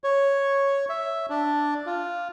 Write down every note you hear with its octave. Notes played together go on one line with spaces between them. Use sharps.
C#5
E5
D4
F4